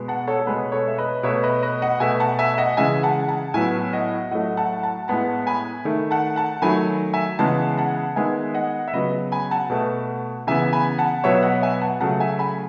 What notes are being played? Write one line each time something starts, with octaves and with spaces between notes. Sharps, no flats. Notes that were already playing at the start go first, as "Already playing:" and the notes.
Already playing: B2 G#3 B3
F#5 A5
A4 C#5
A4
B2 G#3 B3 G#4 B4
A4 C#5
E5
B4 D#5
B2 A3 C#5 E5
B4 D#5
B4 D#5
D#5 F#5
B2 A3 E5 G#5
F#5 A5
E5 G#5
E5
D#5 F#5
C#3 E3 G#3 E5 G#5
F#5 A5
F#5 A5
A2 F#3 B3 E5 G#5
D#5 F#5
A2 F#3 A3 D#5 F#5
F#5 A5
F#5 A5
A2 G#3 B3 F#5 A5
G#5 B5
D#3 A3
F#5 A5
F#5 A5
D#3 F#3 A3 G#5 B5
E5 G#5
C#3 E3 G#3 B3 F#5 A5
F#5 A5
D#3 G#3 B3 E5 G#5
D#5 F#5
E5
C#3 F#3 B3 B4 D#5
G#5 B5
F#5 A5
B2 A3
C#3 E3 B3 E5 G#5
G#5 B5
F#5 A5
B2 F#3 B3 C#5 E5
E5
D#5 F#5
E5 G#5
F#5 A5
C#3 F#3 A3 F#5 A5
E5 G#5
G#5 B5